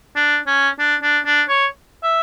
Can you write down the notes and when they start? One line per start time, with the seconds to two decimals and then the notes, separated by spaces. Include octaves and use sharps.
0.16 D4
0.47 C#4
0.79 D4
1.02 D4
1.25 D4
1.49 C#5
2.03 E5